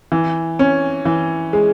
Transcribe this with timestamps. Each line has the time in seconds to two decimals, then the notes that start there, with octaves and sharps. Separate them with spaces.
0.12 E3
0.59 C#4
1.05 E3
1.53 G#3